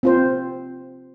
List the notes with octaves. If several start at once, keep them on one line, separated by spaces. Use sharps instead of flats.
C4 F4 C5